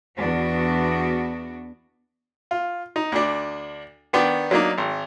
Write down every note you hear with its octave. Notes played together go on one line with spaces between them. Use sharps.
E2 B3 D4 F#4
F4
D#4
D2 D4
D#3 B3 D4
F#3 A#3 D4 D#4
G#1